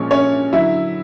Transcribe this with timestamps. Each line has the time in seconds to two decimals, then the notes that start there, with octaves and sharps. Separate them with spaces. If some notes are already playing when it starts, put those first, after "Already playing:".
Already playing: A#2 F3 G#3 C#4 C#5
0.11 C#4 C#5
0.53 D3 F#3 E4 E5